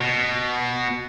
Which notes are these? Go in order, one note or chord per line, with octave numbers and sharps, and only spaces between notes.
B2